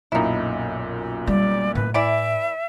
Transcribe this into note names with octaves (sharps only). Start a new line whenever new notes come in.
B1 F#2 A#2 D#4 E4
G3 D5
A2 B4
E3 E4 D5 E5 D7